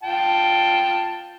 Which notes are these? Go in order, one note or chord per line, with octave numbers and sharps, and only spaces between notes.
F4 G5 A5